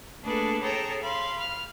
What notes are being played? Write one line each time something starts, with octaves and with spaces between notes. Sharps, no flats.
A3 A#3 D4 G#4 A4 B4
G#4 A4 C#5 G5 A5 A#5
F5 B5 C6
F6